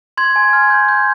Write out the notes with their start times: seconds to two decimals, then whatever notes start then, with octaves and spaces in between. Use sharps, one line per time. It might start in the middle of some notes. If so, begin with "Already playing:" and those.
0.17 C6 G#6
0.36 G#5
0.53 F6
0.70 G6
0.88 G6